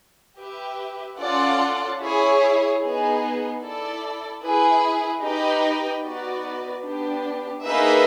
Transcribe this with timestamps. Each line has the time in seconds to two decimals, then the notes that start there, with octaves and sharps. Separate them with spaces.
0.39 G4 B4 E5
1.19 C#4 F4 A4 D5 F#5
2.00 E4 G#4 C#5
2.81 B3 D#4 G#4
3.61 E4 A4 D5
4.42 E4 G#4 B4
5.22 D#4 G4 B4 D#5 G5
6.03 B3 D#4 F#4 B4 D5
6.84 B3 D4 G4
7.65 A#3 D#4 G#4 B4 E5